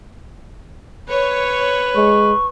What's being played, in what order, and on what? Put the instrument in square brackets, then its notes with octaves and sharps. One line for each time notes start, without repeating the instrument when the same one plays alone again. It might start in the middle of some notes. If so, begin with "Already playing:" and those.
[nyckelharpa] B4 [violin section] C#5
[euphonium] G#3 [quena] C#6